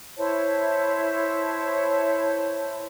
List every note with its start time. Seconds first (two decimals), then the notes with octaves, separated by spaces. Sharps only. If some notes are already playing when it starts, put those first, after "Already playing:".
0.17 E4 C5 C#5 A5